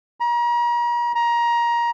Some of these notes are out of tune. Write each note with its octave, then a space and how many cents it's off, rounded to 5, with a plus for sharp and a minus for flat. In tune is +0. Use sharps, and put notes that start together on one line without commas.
A#5 +40
A#5 +20